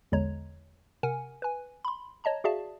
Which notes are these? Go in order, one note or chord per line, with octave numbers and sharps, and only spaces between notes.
A#1 E2 D3 G#3 C#5 A#5
C3 A#4 F#5 G#5
B4 G#5
B5 C6
C#5 D#5 A5 A#5
F#4 G#4 D5 E5 F5 A5